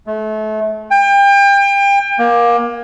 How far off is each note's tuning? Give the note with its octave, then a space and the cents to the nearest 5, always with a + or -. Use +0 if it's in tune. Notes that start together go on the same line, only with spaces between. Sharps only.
A3 -30
G5 +30
A#3 +25